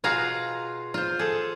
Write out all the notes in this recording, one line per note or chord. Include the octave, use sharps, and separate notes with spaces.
B2 F4 F#4 G#4 F5 A#5
F4 C5
G#4 A4